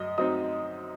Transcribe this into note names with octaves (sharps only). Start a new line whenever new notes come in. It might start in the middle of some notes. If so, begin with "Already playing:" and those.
Already playing: F#2 D#5
F#3 C4 D#4 D#5 D#6